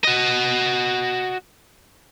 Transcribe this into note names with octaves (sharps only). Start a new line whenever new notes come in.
F#4 D#5